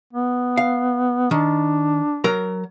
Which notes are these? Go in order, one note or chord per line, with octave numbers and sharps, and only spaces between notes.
B3
F5
D#3 D4
F#3 A#4 A#5